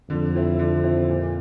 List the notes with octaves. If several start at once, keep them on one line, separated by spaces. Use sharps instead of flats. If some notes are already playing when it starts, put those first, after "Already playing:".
F2 D3
F3 C4 E4
D3
F3 C4 E4
A#2